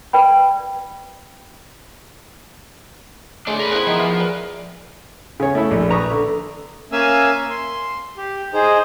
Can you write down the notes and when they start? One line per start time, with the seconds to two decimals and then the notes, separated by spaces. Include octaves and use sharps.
0.13 B4 D5 G5 B5
3.47 A2 G#3 A3 D4 G#4 D5
3.59 A#4 B5
3.72 C3 B3 E4
3.87 D#3 F3
3.99 E3 A#4
4.20 A#2 B4
5.40 C#3 C#5
5.55 A3 E4 A4
5.71 A#1
5.90 B4 A#5 C#6 D#6
6.11 D3
6.92 A#3 C#4 E5 F5 G#5 E6
7.50 C6
8.17 G4
8.53 D#4 G#4 C5